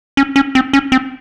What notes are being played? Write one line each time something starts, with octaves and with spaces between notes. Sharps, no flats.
C#4
C#4
C4
C#4
C4